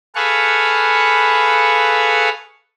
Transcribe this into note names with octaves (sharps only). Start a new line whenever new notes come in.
G#4 A4 B4 F5 F#5 C#6